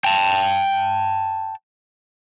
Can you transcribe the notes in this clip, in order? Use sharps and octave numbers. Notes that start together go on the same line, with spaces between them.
G5 A5